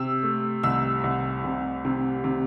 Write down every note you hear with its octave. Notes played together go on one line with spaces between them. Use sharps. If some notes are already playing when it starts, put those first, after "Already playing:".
Already playing: C3 E6
A3
C2 E6
C2
C3
C3
C3